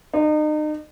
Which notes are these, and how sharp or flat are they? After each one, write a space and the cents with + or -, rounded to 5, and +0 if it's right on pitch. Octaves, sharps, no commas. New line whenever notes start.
D#4 -35